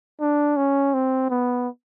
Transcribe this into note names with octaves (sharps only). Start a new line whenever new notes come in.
D4
C#4
C4
B3